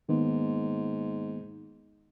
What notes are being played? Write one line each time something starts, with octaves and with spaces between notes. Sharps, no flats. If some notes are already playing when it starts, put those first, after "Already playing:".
G#2 D#3 A#3 B3